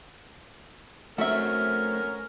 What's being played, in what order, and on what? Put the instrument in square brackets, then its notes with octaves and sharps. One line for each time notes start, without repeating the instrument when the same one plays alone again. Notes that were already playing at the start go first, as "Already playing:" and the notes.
[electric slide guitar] A3 C4 [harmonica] C#4 A#4 [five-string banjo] F#4 E5